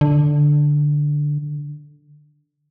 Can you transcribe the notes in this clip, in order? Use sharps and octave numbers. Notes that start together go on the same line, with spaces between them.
D3